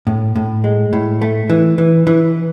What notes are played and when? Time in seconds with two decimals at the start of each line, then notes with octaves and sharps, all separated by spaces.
0.07 A2
0.36 A2
0.64 G#3
0.93 A2
1.22 A3
1.50 E3
1.78 E3
2.07 E3